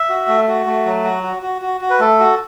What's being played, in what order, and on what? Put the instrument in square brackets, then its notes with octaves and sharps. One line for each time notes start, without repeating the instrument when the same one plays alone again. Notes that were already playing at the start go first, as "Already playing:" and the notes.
Already playing: [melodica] E5
F#4
A3
F#4
A3
F#3
F#4
F#4
F#4
F#4
F#4
B4
A3 A4
F#4